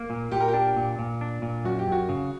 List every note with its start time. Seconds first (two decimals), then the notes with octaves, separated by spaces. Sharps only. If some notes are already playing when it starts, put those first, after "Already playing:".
Already playing: A#3
0.10 A#2
0.31 A#2 G4
0.41 A#4
0.48 G4
0.54 D4
0.76 A#2
0.99 A#2
1.21 D4
1.42 A#2
1.65 F#2 F#4
1.79 G4
1.87 F#2 F#4
2.09 C#3